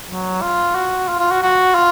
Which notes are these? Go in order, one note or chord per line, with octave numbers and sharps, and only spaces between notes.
F#3
F4
F#4
F4
F4
F#4
F#4
F4